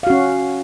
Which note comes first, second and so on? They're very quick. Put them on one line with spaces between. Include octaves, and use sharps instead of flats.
F5 F#4 C#4